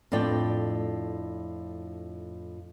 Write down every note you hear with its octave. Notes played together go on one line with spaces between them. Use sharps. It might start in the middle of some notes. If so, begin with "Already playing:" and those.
F2 A2 D4 D5 G5